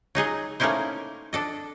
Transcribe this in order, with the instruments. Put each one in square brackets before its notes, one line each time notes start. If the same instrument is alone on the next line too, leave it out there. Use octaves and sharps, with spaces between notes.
[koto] F#3 D#4 G#4 D#5
A3 A#3 C#4 D#4 E4 C5
D4 A4 D#5